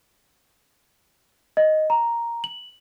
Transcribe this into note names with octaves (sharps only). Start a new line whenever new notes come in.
D#5
A#5
F#7